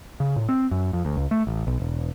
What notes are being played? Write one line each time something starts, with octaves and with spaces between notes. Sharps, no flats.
C#3
A2
C4
F#2
F2
D2
C#2
A3
A1
B1
E1